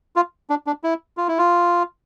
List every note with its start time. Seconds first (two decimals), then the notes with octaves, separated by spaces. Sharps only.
0.16 F4
0.50 D4
0.67 D4
0.84 E4
1.17 F4
1.28 E4
1.38 F4